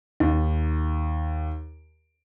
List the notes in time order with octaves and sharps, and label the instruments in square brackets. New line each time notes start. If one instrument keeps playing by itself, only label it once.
[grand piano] D#2 [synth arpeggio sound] D#4